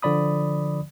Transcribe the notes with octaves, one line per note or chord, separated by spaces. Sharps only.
D3 F3 D5 B5 D#6